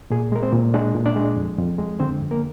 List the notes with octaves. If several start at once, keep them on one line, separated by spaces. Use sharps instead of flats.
A#2 G#4
G#3 A#4
C4 C5
A#2
G#3 D4 D5
A#2
D4 D5
G#3
F2
F2
G#3
D3 C4 C5
F2
A#3 A#4